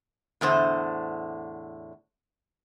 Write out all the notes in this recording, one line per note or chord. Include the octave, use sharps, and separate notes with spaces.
E2 A2 D3 C5